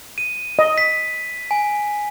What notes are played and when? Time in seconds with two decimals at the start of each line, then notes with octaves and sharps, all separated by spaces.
0.18 D#7
0.59 D#5
0.78 B6
1.51 G#5